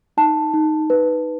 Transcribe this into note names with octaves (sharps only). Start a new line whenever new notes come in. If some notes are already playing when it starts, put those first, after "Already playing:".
D#4 A5
D#4
B4